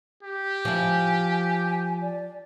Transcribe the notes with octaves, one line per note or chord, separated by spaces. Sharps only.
G4
F3 E4 G#5
D5